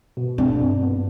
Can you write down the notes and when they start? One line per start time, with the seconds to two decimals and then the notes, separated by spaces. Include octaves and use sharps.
0.17 B2
0.38 C4 D4
0.61 G2
0.82 B3